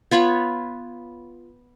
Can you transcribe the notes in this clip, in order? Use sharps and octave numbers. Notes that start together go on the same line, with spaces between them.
B3 F4 C#5 B5